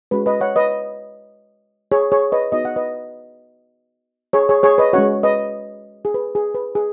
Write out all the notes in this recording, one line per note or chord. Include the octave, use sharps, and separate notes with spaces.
G#3 C#4 F#4 B4
B4 D#5
C#5 F#5
B4 D#5
G#4 C#5
G#4 C#5
B4 D#5
B3 D#4 F#4 D#5
F#5
B4 D#5
G#4 C#5
G#4 C#5
G#4 C#5
B4 D#5
G#3 C#4 F#4 C#5 F#5
B4 D#5
G#4
B4
G#4
B4
G#4